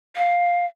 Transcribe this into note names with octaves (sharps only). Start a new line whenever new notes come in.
F5